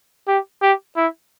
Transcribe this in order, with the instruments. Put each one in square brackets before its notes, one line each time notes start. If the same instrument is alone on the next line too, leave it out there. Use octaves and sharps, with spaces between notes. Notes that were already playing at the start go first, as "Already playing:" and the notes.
[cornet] G4
G4
E4